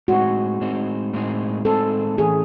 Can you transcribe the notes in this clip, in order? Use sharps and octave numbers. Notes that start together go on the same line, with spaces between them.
A2 G#3 C4 D#4 F#4 G#4
A2 G#3 C4 D#4 G#4
A2 G#3 C4 D#4 G#4
A2 G#3 C4 D#4 G#4 A4
A2 E3 A3 C#4 G#4